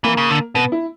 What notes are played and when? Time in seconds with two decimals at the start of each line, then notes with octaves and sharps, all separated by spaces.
0.04 E3 A#3
0.17 C#3
0.30 D3
0.55 B2 B3
0.72 E4